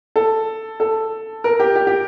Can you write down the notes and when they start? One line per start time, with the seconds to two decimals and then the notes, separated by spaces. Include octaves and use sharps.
0.16 A4
0.80 A4
1.44 A#4
1.60 G4
1.76 G4
1.87 G4